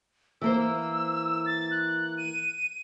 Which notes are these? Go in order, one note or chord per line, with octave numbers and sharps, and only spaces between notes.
E3 A#3 C5 E6
A6
F#6
D#7